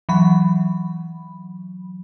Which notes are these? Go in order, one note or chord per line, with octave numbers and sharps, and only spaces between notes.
E3 F#3 B5